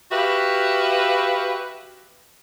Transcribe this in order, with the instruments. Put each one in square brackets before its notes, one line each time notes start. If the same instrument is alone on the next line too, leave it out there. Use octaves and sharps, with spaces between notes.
[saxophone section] F#4 G4 B4 E5 F5